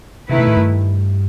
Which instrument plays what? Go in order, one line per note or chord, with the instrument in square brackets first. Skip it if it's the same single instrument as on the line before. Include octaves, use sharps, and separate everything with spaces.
[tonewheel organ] C3 [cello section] D#3 A3 E4 B4
[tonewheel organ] B2
A2
G2